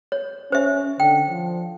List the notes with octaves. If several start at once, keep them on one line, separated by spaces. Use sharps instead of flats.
C#5
C#4 C5 E5
D3 G5
F3